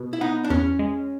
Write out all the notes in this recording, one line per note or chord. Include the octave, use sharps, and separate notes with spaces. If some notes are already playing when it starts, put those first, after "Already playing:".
Already playing: B2
E4
B3 D#4
D4
E2 C#4
G#3